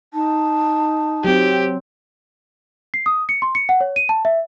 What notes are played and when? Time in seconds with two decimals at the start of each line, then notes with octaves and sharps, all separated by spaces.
0.14 D#4 A5
1.24 F#3 C4 G4
2.94 C7
3.06 D#6
3.29 C#7
3.42 C6
3.55 C#7
3.69 F#5
3.81 C#5
3.96 D#7
4.09 A5
4.25 E5